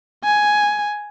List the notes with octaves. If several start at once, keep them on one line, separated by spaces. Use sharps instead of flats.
G#5